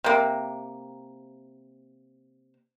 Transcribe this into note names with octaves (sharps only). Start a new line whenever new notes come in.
C3 A#3